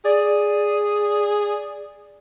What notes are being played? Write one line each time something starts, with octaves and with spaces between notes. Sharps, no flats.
G#4 D5